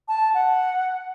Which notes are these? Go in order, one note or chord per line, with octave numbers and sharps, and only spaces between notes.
A5
F#5